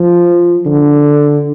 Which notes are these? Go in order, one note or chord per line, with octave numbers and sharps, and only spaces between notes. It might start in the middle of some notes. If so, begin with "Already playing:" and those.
Already playing: F3
D3